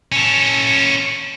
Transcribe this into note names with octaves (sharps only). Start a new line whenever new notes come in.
C#4 A4